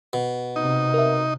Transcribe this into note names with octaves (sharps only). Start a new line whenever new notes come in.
B2
C3 D#4
A#4 E5